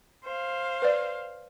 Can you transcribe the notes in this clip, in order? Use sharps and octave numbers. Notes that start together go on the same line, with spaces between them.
C5 F5
B4 D5